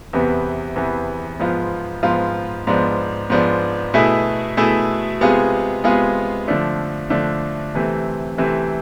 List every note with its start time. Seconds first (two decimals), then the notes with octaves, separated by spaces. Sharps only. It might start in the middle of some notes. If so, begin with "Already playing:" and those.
0.13 E2 C3 E3 B3
0.76 E2 C3 E3 B3
1.40 G#2 F3 B3 F4
2.03 G#2 F3 B3 F4
2.67 G#2 F3 B3 D4
3.30 G#2 F3 B3 D4
3.94 B2 A3 E4 G#4
4.57 B2 A3 E4 G#4
5.21 C3 G#3 B3 F4 G#4
5.84 C3 G#3 B3 F4 G#4
6.48 D3 F3 A3 D4
7.10 D3 F3 A3 D4
7.75 C3 E3 A3 C4
8.38 C3 E3 A3 C4